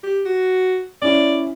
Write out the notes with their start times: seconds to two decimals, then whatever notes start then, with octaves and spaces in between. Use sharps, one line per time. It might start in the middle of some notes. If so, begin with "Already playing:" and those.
0.03 G4
0.25 F#4
1.02 C#4 E4 D5